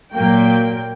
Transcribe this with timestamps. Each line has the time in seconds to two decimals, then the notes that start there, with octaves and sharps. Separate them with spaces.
0.13 A#2 F#3 A#3 G5